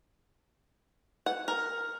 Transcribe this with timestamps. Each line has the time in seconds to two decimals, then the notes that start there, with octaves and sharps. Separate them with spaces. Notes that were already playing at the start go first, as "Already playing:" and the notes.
1.26 F#5
1.48 A#4